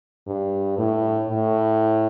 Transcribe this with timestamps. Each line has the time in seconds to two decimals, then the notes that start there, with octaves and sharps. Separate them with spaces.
0.27 G2
0.78 A2
1.29 A2